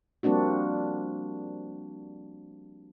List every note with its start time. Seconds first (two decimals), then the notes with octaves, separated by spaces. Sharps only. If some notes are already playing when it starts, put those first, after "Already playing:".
0.23 F3 G3 A#3 C4 D4 F#4